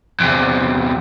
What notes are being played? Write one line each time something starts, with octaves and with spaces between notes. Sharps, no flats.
E2 C3